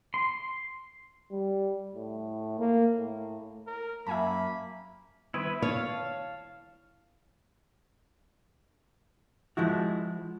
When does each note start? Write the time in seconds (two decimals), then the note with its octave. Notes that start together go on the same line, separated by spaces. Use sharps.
0.14 C6
1.31 G3
1.95 A2
2.59 A#3
2.97 A2
3.67 A#4
4.07 F#2 A#3 F#4 E5 G#5 A5 B5
5.34 D#3 G3 B3 E4 B4
5.62 E4 C#5 F5 A5
9.57 F3 G#3 E4 F#4